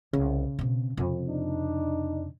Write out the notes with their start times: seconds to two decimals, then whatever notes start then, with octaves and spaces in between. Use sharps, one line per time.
0.13 C2 C#3
0.59 B2 C4
0.97 F2 C3
1.28 D4 D#4